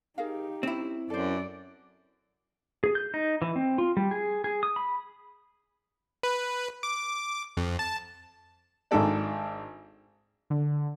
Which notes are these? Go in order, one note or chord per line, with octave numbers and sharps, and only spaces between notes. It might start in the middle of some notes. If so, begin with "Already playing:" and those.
D#4 G4 G#4 A#4 F5
C4 C#4 E4
F#2 A4 C5 D5
G#4
G6
D#4
E3
C4
F4
G3
G#4
G#4
D#6
B5
B4
D6
F2
A5
G#1 D#3 D4 A4 D5
D3